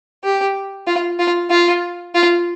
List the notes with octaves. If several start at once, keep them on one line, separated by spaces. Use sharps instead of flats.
G4
F4
F4
F4
F4